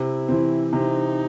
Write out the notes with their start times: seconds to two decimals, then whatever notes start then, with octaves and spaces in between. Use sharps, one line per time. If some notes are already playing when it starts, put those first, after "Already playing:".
Already playing: C3 E4
0.28 E3 C4
0.73 C3 D#4